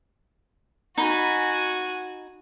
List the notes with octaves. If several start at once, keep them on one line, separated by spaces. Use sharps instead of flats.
D#4 F#4 G#5 B5